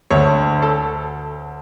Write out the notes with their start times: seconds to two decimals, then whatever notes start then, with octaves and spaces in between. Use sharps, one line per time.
0.10 D2 D3 C#5
0.62 A4